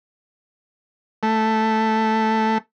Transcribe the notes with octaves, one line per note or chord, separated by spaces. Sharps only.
A3